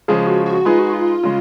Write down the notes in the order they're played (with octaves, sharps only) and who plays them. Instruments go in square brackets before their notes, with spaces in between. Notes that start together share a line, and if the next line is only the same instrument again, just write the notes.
[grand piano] C#3 F3 G#3 [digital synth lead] G#4
[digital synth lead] F#4
F#4
[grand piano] G#3 D#4 G#4 B4 [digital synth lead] F4
[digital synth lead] F#4
F4
[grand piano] C#3 G#3